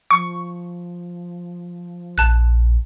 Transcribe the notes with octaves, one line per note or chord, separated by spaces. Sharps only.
F3 C#6
A#1 A5 F#6